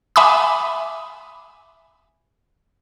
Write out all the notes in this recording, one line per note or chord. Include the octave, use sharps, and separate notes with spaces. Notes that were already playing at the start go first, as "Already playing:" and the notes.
E5 G#5 B5 D6 D#6